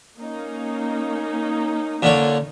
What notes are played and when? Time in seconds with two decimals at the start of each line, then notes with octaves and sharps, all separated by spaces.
0.17 A#3 C#4 D#4
2.02 A#2 D3 C#5